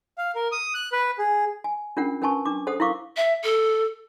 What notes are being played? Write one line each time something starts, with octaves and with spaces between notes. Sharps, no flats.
F5
A#4
D#6
F#6
B4
G#4
G#5
C#4 D4 F4 A#4 F#5
C#4 A#4 B4 G#5 A5 C#6
D4 D6
A4 C5 F#5 D#6
E4 A#4 F5 C#6 D6
E5
A4